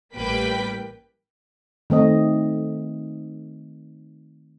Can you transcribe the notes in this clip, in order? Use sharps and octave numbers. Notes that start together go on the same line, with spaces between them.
A1 G3 A#3 B4 G5 B6
D#3 A3 C4 D#5